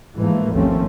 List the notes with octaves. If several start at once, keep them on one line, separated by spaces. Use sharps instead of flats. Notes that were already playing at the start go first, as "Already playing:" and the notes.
G#2 E3 F3 A3 A#3
G#1 D#2 F3 A3 C4 C#4